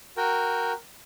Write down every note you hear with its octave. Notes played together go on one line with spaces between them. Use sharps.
F#4 A#4 G5